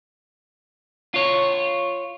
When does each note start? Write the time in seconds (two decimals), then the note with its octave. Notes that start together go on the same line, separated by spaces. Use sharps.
1.14 F4 C#5